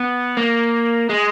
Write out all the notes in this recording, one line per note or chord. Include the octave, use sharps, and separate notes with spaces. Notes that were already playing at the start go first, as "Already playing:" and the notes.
Already playing: B3
A#3
G#3